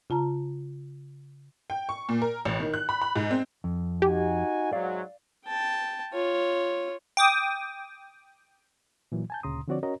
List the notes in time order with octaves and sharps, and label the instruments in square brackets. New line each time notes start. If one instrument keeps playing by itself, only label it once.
[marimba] C#3 F4 A5 A#5
[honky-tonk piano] G5
C#6
A#2
A#4
A1
D#3
F#6
B5
B5
G#2
C4
[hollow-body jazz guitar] F2
[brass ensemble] D#4 F#4 G#5 [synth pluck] G4
[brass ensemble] G#2 F#3 [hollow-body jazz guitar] D5 F5
[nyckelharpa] G5 A5
F4 C#5
[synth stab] G5 D6 D#6
[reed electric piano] A#2 E3 F#3
G#5 A5 G6
D2 A#2 C#3 A#5 C6 D#6
D3 F3 C4 F#4 C#5 D5
C#4 F#4 A#4 C#5 D#5 A#5